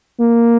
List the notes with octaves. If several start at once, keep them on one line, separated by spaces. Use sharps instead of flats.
A#3